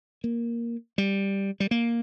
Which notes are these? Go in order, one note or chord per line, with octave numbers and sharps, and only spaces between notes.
A#3
G3
G3
A#3